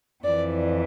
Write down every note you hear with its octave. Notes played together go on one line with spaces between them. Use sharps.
F2 E3 D5